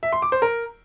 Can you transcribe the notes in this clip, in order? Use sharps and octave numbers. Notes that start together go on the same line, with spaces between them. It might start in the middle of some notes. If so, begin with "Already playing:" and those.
E5
C6
D6
C5
A#4